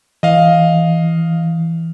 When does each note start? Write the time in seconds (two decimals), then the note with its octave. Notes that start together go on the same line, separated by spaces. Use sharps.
0.23 E3 D#5 F5